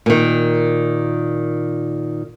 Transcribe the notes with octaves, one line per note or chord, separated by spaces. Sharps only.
A#2 D#3